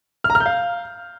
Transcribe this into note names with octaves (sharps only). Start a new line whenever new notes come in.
F6
A#5
F6
G6
F5